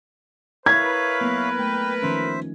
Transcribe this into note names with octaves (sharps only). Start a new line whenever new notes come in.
E4 A#4 B4 C#5 E5 F5 G#6
F#3 A#3 B3
A3 G5
D#3 F3 C#4 C5 E5